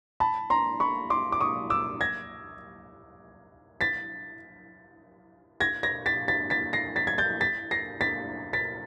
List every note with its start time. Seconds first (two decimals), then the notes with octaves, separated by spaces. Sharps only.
0.20 A5 B5
0.50 A#5 C6
0.80 B5 C#6
1.10 C6 D6
1.32 D6
1.41 C#6 D#6
1.70 D6 E6
2.01 G#6 A#6
3.81 A6 B6
5.60 G#6 A#6
5.83 G#6 A#6
6.06 A6 B6
6.28 A6 B6
6.50 A6 B6
6.73 A#6 C7
6.96 A6 B6
7.07 G#6
7.18 G6 A6
7.41 A6 B6
7.71 A#6 C7
8.01 A6 B6
8.53 A6 B6